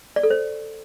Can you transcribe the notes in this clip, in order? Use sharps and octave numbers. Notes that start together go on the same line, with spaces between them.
D5
A4
C5